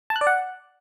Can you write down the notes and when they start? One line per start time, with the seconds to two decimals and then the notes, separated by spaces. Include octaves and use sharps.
0.10 A5
0.16 F#6
0.21 D5
0.27 F#5